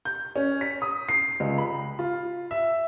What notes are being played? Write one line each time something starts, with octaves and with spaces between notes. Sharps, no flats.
G6
C#4
B6
D#6
C7
C#2
B5
F4
E5